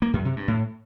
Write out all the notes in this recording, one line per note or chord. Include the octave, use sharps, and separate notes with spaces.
A#3
F#2
C3
G2
A2